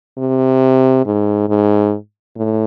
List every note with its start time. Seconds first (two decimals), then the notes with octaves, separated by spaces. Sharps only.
0.18 C3
1.06 G#2
1.49 G#2
2.37 A2